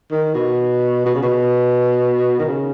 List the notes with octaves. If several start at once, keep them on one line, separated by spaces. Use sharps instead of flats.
D#3
B2
B2
C#3
B2
D#3
C#3